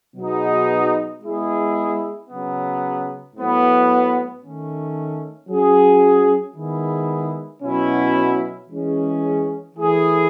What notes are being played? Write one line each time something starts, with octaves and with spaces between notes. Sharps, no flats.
B2 F#3 B3 D#4 G#4
G#3 B3 E4 G#4
C#3 F#3 B3
A2 F#3 B3
D#3 A3 C#4
F#3 C#4 G#4
D#3 G#3 B3 E4 G#4
B2 F#3 C#4 E4
E3 G#3 C#4 G#4
E3 A3 E4 G#4